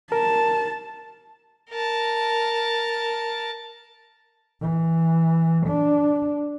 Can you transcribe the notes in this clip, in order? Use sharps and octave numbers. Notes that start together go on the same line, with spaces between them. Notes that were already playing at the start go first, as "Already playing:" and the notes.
A#4 A5
A#4 A5
E3
D4